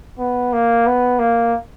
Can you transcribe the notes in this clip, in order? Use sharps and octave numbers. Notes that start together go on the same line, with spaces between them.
B3
A#3
B3
A#3